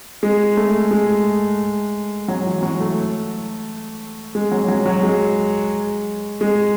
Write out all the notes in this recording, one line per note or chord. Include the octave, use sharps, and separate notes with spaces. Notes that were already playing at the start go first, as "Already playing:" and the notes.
G#3
A3
G#3
F#3
E3
F#3
A3
G#3
F#3
F#3
F#3
G#3
G#3